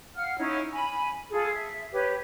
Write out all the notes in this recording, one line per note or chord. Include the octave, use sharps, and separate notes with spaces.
F5 F#5 F6
C#4 D#4 E4 C#5
G#5 B5
F4 G#4 A4
E5
G4 B4 C#5